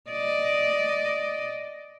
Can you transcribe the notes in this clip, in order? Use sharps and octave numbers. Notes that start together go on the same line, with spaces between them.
D5 D#5